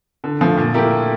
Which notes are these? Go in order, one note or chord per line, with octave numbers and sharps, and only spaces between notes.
D3
F3 A3
A#2
A3 E4 G4 A#4